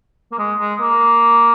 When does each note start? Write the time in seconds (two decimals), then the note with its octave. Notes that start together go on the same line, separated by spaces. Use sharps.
0.32 A#3
0.38 G#3
0.59 G#3
0.80 A#3